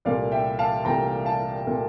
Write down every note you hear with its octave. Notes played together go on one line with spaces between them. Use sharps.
C2 A#2 A3 D5 F5
E5 G5
F5 A5
C2 A#2 A3 G5 A#5
F5 A5
A#2 A3